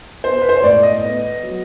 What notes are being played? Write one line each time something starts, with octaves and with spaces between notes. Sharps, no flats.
B3 C5
B4
C5
C#5
A2 D5
D#5
B3
F#3